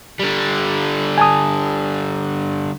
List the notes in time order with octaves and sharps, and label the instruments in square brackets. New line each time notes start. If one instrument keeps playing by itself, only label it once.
[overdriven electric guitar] D3 G3
[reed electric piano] G#5 A5 D#6